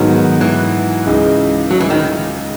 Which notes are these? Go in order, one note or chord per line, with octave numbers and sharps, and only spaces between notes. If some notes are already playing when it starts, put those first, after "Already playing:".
Already playing: G#2 D#3 F#3 B3 F#4
E3
C#2 C#3 G#3 D#4
F#3
E3
D#3